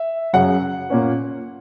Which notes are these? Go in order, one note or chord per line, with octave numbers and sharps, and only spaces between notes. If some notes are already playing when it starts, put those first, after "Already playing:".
Already playing: E5
F#2 C#3 F#3 F#5
A#2 A#3 C#4